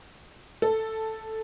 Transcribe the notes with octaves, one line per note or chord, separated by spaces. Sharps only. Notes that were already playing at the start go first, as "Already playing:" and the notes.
A4